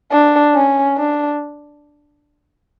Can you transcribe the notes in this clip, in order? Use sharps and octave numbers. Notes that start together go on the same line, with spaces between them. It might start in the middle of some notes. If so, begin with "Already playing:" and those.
D4
C#4
D4